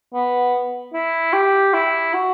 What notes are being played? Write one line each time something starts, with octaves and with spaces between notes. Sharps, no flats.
B3
E4
G4
E4
F#4